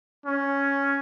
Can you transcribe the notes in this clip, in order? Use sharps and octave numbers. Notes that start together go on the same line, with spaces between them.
C#4